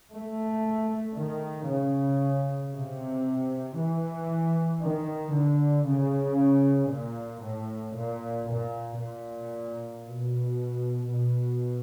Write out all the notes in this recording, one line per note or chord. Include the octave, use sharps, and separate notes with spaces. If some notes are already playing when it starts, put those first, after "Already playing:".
A3
D#3
C#3
C3
E3
D#3
D3
C#3
A#2
A2
A#2
A#2
A#2
B2
B2